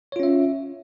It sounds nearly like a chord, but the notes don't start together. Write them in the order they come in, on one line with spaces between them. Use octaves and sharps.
C#5 F4 C#4 E5